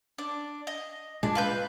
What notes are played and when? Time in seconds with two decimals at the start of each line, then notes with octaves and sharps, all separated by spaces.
0.18 D4
0.67 D#5
1.23 A#2 G#3 D4
1.35 F4 B4 G6